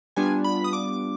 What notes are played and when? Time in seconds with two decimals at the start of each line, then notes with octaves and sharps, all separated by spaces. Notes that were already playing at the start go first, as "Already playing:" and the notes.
0.16 G3 B3 D4 F4 G#5
0.44 B5
0.64 D#6
0.73 D6